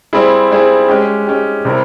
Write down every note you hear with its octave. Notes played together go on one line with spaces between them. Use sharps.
G3 C4 E4 G#4
G3 C4 E4 G#4
G#3 C#4 G4
G#3 C#4 G4
C3 G3 C4 E4 A#4